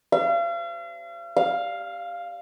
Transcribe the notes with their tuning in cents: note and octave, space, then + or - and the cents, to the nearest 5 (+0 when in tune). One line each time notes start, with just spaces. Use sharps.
F5 -40
F5 +0